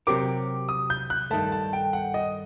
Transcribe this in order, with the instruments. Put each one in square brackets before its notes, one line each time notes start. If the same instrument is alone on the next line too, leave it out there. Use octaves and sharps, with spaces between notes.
[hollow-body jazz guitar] C3 F#3 C4 G4 A#4 [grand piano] D6
[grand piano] D#6
G6
F#6
[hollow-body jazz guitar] G2 D#3 A3 [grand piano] A5
[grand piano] A5
G5
F#5
D#5